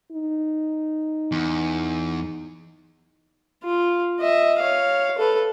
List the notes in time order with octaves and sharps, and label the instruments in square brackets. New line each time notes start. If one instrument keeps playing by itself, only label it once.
[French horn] D#4
[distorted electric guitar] E2
[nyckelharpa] F4
D#5 E5
C#5 F5
A4 B4